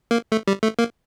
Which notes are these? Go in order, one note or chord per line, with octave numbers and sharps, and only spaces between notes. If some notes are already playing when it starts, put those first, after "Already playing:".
A#3
A3
G3
A3
A#3